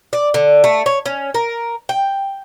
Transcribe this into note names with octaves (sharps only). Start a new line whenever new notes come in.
D5
D3
A3
C#5
C#4
A#4
G5